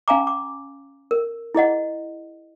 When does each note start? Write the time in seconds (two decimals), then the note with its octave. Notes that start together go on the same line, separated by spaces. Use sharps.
0.08 C#4 F5 G#5 A#5 D6
0.27 D6
1.11 A#4
1.55 E4 G#4 D#5 F#5